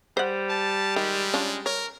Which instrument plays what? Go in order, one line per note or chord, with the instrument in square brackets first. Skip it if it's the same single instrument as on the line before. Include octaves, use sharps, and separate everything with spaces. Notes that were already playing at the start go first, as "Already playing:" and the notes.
[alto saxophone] G3 [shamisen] C5 F#5
[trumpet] A5
[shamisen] D#3 [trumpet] G#3
[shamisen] C#4 D4 F4
[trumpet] A#4 [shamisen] C#5